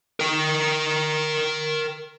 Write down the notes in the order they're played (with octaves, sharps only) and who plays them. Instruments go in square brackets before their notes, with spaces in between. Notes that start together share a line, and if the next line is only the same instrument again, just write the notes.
[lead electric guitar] A#4 G5